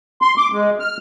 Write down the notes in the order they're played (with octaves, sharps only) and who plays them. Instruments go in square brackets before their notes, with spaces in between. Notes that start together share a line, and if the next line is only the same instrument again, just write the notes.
[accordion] C6
D6
G#3
F6